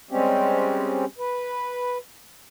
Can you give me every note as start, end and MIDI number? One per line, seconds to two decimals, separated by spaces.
0.11 1.05 55
0.11 1.05 56
0.11 1.05 60
0.11 1.05 61
0.11 1.05 67
1.18 1.98 71